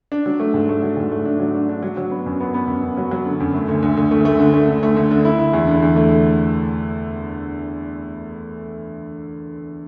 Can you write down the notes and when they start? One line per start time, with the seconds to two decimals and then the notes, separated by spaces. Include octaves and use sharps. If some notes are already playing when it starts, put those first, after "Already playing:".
0.12 D4
0.26 F#3
0.40 A3
0.54 G#2
0.69 A3
0.82 F#3
0.97 G#2
1.11 A3
1.25 D4
1.40 F#3
1.54 D4
1.69 D4
1.83 F#3
1.97 F#3
2.11 B3
2.26 F#2
2.40 B3
2.54 B3
2.68 F#2
2.83 F#2
2.97 F#3
3.11 F#3
3.25 D3
3.40 F#2
3.54 A3
3.68 D2
3.82 D2
3.97 D2
4.11 A3
4.25 A3
4.40 D3
4.54 A3
4.68 D3
4.83 A3
4.97 D2
5.11 D3
5.25 E4
5.39 E4
5.53 E2
5.67 D3
5.82 E2
5.96 A3